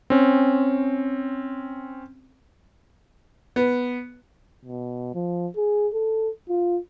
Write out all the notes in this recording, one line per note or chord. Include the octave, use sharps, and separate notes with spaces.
C4 C#4
B3
B2
F3
G#4
A4
F4